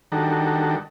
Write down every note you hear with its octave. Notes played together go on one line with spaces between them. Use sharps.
D#3 G3 D4 F#4 A4 A#4